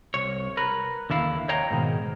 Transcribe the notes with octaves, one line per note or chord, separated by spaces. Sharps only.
C2 C#5
A#4 B4
D#2 D3 E4 F5
C#5 D#5 F5 G5 A#5
G#2 B2 D#3